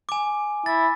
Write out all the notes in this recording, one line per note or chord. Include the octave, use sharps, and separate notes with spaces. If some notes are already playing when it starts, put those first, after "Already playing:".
G#5 D6
E4 A6